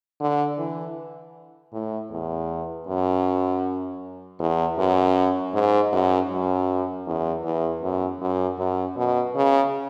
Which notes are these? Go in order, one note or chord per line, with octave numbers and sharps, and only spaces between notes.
D3
E3
A2
E2
F#2
E2
F#2
G#2
F#2
F#2
E2
E2
F#2
F#2
F#2
B2
C#3